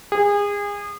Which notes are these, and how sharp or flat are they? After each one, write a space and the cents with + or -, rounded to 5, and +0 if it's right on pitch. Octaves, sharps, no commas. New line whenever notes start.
G#4 -30